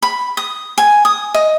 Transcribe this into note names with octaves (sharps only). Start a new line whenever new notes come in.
B5
D#6
G#5
D#6
D#5